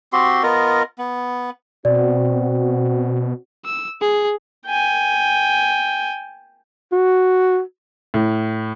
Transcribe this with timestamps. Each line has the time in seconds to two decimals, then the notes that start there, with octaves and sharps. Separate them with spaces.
0.13 C4 F#4 G4 C6
0.43 B3 F4 A#4 D#5
0.98 B3
1.85 B2 C4 F#4 D5
3.65 E6
4.01 G#4
4.67 G5 G#5
6.92 F#4
8.14 A2